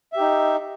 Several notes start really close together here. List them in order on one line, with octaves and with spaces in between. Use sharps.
E5 G4 D#4